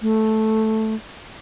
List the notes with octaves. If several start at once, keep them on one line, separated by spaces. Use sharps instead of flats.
A3